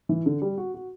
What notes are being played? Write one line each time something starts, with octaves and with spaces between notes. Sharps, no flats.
E3
D3
G3
F#4
F#4